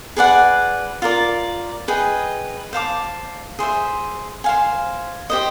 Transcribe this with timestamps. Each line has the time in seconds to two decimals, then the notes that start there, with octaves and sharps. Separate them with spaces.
0.17 G#4 B4 D5 F#5
1.02 F4 A#4 D5
1.88 G#4 B4 D#5 G5
2.73 C5 F5 A5 D6
3.59 G#4 C5 E5
4.44 C5 F5 G#5
5.30 G4 C5 D#5